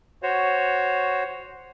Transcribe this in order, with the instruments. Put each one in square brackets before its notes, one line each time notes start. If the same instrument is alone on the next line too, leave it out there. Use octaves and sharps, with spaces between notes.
[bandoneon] F#4 C5 C#5